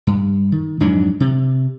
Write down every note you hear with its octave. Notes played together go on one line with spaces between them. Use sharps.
G2
D#3
F2 G#2 F#3 D4
C3